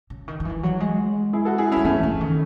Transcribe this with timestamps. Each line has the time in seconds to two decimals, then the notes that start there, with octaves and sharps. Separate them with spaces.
0.10 C#3
0.28 D#3
0.40 D#3
0.45 E3
0.63 F#3
0.80 G#3
1.33 E4 G#4
1.45 F#4 A4
1.58 E4 G#4
1.72 F#3 C#4 E4
1.85 E3 A3 C#4
2.03 C#3
2.21 D#3